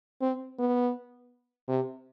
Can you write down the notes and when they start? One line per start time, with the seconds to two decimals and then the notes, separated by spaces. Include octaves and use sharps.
0.21 C4
0.59 B3
1.68 C3